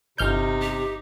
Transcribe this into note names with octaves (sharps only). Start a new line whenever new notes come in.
G1 C3 D#4 F6 G6
G4